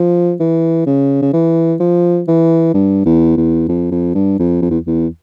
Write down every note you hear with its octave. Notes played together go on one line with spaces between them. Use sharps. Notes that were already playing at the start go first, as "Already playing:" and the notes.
Already playing: F3
E3
C#3
C#3
E3
F3
E3
G2
E2
E2
F2
F2
G2
F2
F2
E2
E2